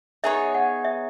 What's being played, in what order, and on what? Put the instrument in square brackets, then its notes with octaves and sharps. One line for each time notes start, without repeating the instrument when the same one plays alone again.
[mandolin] B3 D#4 G#4 C#5 [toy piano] E5
[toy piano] F#5
E5